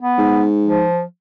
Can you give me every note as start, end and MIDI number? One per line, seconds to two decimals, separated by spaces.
0.01 0.46 59
0.18 0.86 44
0.64 1.02 53